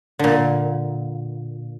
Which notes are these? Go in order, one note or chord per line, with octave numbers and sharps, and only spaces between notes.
A#2 D3